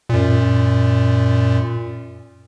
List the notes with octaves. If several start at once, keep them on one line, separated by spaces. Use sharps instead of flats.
F#2 A#2